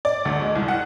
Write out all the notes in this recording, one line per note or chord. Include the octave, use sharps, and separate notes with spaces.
D5
D2
G#3
C2
F#5